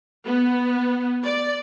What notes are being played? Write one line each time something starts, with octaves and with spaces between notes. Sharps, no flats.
B3
D5